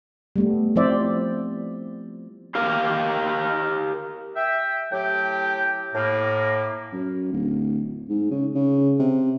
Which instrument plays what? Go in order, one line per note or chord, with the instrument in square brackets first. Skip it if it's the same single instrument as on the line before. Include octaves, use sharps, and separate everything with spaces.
[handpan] G3 A3 B3
F3 C4 E4 C5 D5 E5
[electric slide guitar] G4 A#4 F5
[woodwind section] E5 G5
A2 F#3 G4 G5
A2 A#3
[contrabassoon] F#2
D1
G#2
C#3
C#3
C3